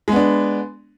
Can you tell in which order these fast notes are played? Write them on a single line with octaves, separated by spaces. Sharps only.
G#3 B3 D4